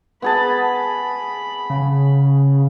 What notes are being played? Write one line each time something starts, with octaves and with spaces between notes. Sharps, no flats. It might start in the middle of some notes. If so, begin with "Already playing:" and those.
B3 G#4 A5 B5
C#3